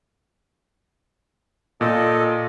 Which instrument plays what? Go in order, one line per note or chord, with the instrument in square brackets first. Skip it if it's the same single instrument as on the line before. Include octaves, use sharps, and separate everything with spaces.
[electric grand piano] A#2 [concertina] A4 D#5